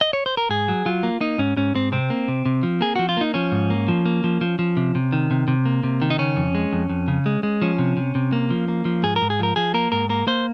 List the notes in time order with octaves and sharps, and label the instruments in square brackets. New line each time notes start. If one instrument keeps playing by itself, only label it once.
[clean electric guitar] D#5
C#5
C5
A#4
G#2 G#4
F#3
F#3 F4
A#3
A#3 D#4
G#2 C#4
G#2 C#4
G#2 C4
C3 C4
A#3
C3
C3
F3
A#3 G#4
F3 F#4
F4
A#3 D#4
F3 C#4
G#2
A#3
F3
A#3
F3
F3
F3
C3
C3
D#3
C3
C3
A#3
C3
D#3
D#4
C#3 C#4
F2
G#3
F2
F2
C#3
G#3
G#3
F3 C#4
C3
C3
C3
A#3
F3
A#3
F3
G#2 G#4
A#4
G#2
G#4
F3 A#4
F3 G#4
A#3 A#4
G#2 A#4
A#3 A#4
A#3 C5